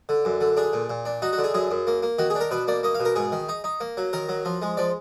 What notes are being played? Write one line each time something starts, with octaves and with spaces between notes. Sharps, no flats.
D3
F#2
D3
D4 G#4
A#2
A#2
D4
D#4 F#4
F#4
D3
G#4
F#2 G#4
F#2
A#3
A#3
D#3 F#4
G#4
D4
A#4
B2 B4
A#3 D5
A#3 D#5
F5
B2
A#4
G#2 G#4
D#3
D#4
D#4
A#3
F#3
D#3 A#4
F#3
F3
G#3
F3 D5